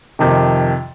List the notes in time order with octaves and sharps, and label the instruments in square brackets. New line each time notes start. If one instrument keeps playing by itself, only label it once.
[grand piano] F2 C3 D#3